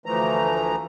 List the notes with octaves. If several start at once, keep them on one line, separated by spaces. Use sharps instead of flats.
D2 E3 F3 A3 A#5